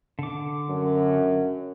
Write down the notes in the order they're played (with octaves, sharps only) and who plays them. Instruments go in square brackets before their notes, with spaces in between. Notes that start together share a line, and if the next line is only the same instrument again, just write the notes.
[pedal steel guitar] D3 D6
[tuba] F#2